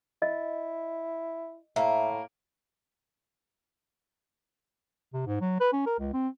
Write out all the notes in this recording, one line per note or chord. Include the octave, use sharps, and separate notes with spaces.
E4 D#5
A2 A#3 E5
C3
G#2
F#3
B4
C#4
A#4
C#2
C4